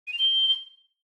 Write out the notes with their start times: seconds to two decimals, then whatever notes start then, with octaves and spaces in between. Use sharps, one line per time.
0.07 D#7
0.13 F7
0.19 G7